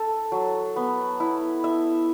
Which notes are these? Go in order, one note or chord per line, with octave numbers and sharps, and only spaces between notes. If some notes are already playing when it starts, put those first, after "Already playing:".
Already playing: A4
F#3
B3
E4
E5